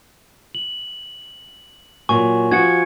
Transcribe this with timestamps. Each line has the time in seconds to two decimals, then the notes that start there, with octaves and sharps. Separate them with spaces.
0.55 F#7
2.09 A#2 F#3 G#5 C#6
2.52 F3 F#4 G#6 C#7